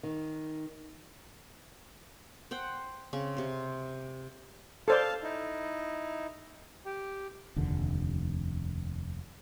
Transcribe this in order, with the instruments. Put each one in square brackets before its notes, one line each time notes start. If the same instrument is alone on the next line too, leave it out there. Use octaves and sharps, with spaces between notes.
[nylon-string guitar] D#3
[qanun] C5 F#5 G5
C#3 C4 C#6
C3 C5
[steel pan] A4 C5 D5 [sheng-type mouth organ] F5 A5
[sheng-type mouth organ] D#4 E4
G4
[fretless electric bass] F1 D#2 D3